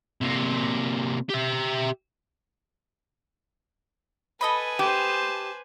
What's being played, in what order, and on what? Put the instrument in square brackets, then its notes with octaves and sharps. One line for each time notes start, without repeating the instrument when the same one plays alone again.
[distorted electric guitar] C3 A#3
G4 E5
[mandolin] A4 D#5 B5 [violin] B4 G#5
[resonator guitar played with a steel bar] G4 [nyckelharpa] C5 A5